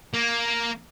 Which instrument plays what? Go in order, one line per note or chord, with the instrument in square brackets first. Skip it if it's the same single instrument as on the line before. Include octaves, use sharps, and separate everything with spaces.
[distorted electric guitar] A#3